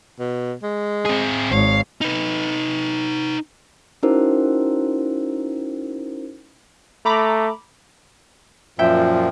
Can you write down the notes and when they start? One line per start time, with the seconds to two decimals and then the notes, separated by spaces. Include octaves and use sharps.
0.19 B2
0.63 G#3
1.05 C4 G#4
1.52 G#1 C#5 F5
2.01 D#4 B4
4.03 C#4 D#4 E4 F#4 A#4 C5
7.05 A3 A#5 B5 D6
8.79 F#2 A#2 F3 E5 G5